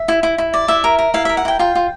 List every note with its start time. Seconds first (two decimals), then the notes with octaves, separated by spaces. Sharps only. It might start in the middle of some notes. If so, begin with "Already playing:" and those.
Already playing: E5
0.08 E4
0.23 E4
0.38 E4
0.54 D5
0.68 E4 E5
0.84 A#4
0.99 A#4
1.14 E4 F5
1.25 A#4 E5
1.37 F#5
1.45 E4 G5
1.59 F4 G5
1.75 F4